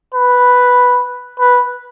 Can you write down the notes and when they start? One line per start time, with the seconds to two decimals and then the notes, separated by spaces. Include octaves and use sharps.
0.14 B4
1.40 B4